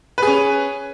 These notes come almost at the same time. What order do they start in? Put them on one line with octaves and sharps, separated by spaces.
B4 G#4 C#4